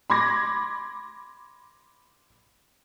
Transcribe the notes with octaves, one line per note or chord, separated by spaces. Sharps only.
B5 C6 D6 G#6 A#6